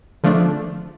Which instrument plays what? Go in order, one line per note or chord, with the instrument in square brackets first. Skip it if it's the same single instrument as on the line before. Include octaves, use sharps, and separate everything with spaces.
[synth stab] D3 F3 A3 D4